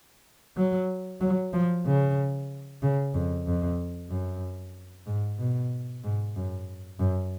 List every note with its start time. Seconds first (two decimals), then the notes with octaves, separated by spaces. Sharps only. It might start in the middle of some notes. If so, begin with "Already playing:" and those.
0.57 F#3
1.21 F#3
1.53 F3
1.86 C#3
2.83 C#3
3.15 F2
3.47 F2
4.11 F#2
5.07 G#2
5.40 B2
6.04 G#2
6.36 F#2
6.99 F#2